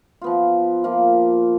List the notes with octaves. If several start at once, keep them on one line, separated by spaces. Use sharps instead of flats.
F3 B3 F4
F3 A#3 F4